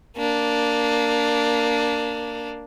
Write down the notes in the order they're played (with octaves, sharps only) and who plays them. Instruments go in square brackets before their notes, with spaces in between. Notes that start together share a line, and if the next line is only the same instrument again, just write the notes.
[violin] A#3 D4